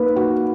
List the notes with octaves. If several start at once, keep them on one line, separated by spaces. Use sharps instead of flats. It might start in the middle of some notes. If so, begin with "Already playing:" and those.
Already playing: A#3 D#4 B4
F#4